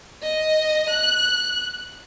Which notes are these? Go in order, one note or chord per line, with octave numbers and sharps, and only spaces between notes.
D#5
F#6